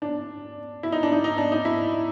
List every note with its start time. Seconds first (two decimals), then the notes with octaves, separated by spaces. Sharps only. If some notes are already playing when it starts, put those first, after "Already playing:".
0.02 D4
0.83 E4
0.92 D#4
1.03 D4
1.13 D#4
1.24 D#4
1.38 D4
1.52 D#4
1.65 E4